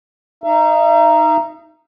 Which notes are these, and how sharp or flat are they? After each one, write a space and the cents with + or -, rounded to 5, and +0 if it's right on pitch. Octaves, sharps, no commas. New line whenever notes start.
D#4 +0 E5 +45